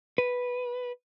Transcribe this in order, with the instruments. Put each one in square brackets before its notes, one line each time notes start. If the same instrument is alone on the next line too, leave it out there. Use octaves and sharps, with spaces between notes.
[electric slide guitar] B4